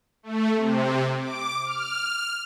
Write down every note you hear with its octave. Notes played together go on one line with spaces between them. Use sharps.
A3
C3
D6
F6